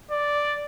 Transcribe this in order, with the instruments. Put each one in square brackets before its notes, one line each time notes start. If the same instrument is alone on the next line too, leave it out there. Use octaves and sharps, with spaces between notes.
[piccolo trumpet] D5